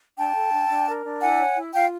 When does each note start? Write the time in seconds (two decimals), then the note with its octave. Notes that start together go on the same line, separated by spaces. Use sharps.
0.17 D4 G5 A5
0.34 A4
0.51 D4
0.69 D4
0.87 A#4
1.04 D4
1.21 E4 F#5 G#5
1.39 C#5
1.56 E4
1.73 F4 F5 G5